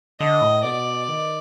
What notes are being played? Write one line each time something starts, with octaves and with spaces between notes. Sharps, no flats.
D3 D#5
A2
B2 D5
D#3